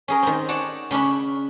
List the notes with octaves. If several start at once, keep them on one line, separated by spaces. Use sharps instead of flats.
C#4 G#4 A#4
D#3 C4
C#5 D5 F#5 A5
C#3 C#4 D4 B5